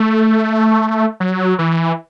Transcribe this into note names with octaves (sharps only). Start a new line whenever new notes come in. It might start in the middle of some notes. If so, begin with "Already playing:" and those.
Already playing: A3
F#3
E3